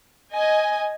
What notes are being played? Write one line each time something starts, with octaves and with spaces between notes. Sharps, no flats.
D#5 G#5